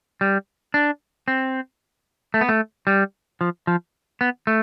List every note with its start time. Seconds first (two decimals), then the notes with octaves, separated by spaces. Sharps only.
0.21 G3
0.74 D4
1.28 C4
2.34 A3
2.41 B3
2.49 A3
2.87 G3
3.41 F3
3.67 F3
4.21 B3
4.47 A3